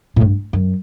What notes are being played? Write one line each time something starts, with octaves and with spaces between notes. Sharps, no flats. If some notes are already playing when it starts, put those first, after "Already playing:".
A2
G2
F#2